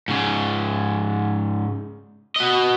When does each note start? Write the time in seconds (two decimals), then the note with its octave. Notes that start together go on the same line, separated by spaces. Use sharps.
0.08 G#2 C#3
2.36 F#4 D#5